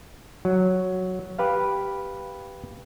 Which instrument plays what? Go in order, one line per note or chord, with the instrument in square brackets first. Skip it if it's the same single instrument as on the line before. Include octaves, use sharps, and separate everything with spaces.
[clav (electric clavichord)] F#3
G4 B4 F5